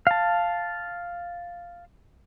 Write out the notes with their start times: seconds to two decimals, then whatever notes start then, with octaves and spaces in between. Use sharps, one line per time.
0.07 F5 A5